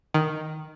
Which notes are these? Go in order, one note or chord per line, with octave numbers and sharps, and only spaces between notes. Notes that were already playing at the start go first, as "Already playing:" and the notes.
D#3